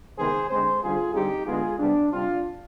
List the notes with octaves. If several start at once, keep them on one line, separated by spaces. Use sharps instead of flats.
C3 D#3 G#3 B3 G#4 C5
D3 G#3 C4 G#4 C5
D3 G3 C4 F4 G#4
D3 G3 C4 D#4 G4
D3 G#3 B3 F4 G#4
C3 G3 B3 D4
C3 G3 C4 D4 F4